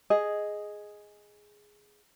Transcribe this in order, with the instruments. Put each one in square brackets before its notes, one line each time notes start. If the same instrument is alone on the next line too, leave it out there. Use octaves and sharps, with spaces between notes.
[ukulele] G#4 D#5